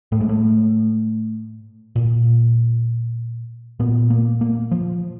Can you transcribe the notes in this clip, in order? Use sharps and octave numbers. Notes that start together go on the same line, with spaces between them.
A2 A3
G#3
A3
A#2
A#2 B3
A#3
A#3
F3